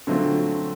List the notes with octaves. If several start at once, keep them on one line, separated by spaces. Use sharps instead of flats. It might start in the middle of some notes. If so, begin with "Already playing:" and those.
D3 F#3 A3 C4 F4